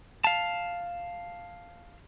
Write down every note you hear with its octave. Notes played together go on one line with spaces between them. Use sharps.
F5 A5